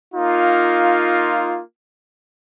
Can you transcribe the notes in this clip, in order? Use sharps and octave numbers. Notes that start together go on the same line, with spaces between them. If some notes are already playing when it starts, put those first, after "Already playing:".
A#3 D#4 F4